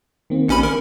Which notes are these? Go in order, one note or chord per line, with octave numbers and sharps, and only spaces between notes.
D#3 A#3 C4
A1 C#4 B5 C#7
A#4